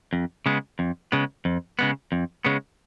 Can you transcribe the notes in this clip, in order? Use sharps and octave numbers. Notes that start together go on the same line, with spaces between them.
F2
C#3 G#3 B3
F2
C#3 G#3 B3
F2
C#3 G#3 B3
F2
C#3 G#3 B3